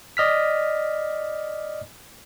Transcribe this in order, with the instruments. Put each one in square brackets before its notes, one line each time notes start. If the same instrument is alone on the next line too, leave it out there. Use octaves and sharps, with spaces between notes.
[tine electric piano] D5 D#5 F6 B6